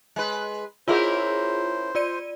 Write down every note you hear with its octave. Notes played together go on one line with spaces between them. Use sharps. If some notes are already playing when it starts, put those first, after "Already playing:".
G#3 B4
C#4 E4 F4 G#4 A#4 C5
F4 D5 D#7